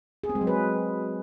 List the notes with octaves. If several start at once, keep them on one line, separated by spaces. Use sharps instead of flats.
G#4
C4
G#3
F#3
B4